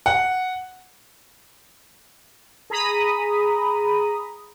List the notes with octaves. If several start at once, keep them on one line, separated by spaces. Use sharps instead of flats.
F#5
G#4 A#5 B5 D#6